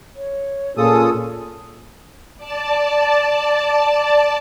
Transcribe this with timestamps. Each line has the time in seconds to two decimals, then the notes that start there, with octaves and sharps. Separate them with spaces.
0.15 C#5
0.77 A#2 C#4 F4 G#4 A4 D#6
2.37 D5 A5